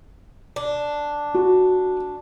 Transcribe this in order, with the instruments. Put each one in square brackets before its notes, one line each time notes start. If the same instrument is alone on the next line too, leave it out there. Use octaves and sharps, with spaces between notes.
[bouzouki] D4
[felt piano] F#4